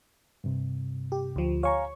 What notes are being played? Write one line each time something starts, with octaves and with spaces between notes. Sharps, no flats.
G2 C3
G4
D2 F3
C#5 F5 G#5 A#5 C#6